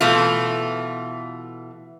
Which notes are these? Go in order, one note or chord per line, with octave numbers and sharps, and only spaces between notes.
B2 E3 A3 F4